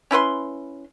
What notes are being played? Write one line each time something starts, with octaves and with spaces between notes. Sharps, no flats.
C#4 E4 B4 C6